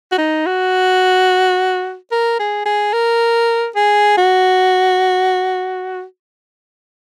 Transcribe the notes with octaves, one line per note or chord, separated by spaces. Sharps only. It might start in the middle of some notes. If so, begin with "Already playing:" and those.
F#4
D#4
F#4
A#4
G#4
G#4
A#4
G#4
F#4